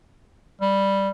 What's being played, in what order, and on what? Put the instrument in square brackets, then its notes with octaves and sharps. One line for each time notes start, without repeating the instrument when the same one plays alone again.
[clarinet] G3